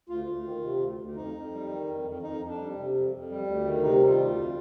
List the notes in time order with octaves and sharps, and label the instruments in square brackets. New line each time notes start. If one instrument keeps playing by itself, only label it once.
[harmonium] D2 F4
D2
D#3
C3
D2
D2
F2 D#4
F2
G3
D#3
F2
F2
F2 D#4
F2
D4
G3
C3
F2
F2
G3
D2
D#3
C3 D#4
G3
F4
D2
F2